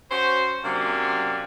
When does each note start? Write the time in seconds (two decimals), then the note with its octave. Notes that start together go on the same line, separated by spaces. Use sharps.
0.11 C#4 F#4 C5
0.64 C3 F#3 A#3 C#4 D4